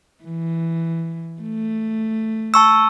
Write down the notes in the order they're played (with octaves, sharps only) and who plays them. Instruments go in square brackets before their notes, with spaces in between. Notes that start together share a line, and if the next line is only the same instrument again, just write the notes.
[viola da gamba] E3
A3
[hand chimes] A5 C#6 E6